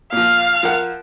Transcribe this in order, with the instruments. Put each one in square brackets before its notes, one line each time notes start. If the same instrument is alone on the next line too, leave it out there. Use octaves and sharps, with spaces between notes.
[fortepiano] A#2 F3 [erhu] F5
[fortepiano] F3 A#4 F#5